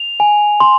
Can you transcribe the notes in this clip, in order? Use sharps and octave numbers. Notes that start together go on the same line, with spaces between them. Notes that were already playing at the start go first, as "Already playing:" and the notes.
Already playing: F7
G#5
C6